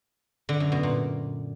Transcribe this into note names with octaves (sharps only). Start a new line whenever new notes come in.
D3
F#2
B2
A#2